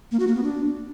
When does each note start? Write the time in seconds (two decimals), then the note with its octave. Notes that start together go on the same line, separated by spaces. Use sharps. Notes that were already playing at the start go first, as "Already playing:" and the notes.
0.11 A#3
0.19 F#4
0.27 A#3
0.35 B3
0.43 D4